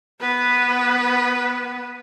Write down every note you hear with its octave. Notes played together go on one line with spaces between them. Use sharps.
B3 B4